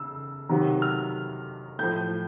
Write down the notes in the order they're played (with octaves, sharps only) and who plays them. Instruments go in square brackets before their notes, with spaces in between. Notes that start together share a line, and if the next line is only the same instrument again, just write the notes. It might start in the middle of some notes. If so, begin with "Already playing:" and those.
Already playing: [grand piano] C#3 E6
C3 D#3 F#3
F6
A2 F3 G6